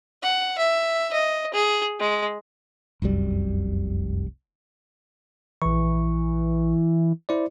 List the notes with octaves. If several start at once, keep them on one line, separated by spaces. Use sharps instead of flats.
F#5
E5
D#5
G#4
G#3
F1 C2 F#2 G3
A#1 E3 C#6
E4 C5 D5